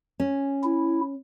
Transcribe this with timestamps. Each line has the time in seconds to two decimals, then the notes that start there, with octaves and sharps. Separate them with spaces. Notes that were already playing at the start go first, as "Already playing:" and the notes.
0.20 C#4
0.64 E4